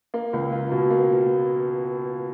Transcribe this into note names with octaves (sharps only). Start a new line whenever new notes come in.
A#3
C#2
F4
B2
A#3